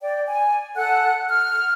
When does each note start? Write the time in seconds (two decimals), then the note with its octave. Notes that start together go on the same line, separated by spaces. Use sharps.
0.01 D5 G5
0.27 G#5
0.75 A4 F#5 F#6
1.30 F6